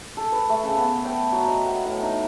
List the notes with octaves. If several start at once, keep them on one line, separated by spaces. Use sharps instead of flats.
A4
B4
A3
C#3
B3
G5
F#3
D#5
F#5
A2
D#4